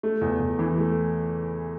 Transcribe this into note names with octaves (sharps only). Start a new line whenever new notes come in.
A3
E2
E2
E3
A3